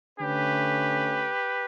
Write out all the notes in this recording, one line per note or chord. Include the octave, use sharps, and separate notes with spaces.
D3 A3 C#4 G4 B4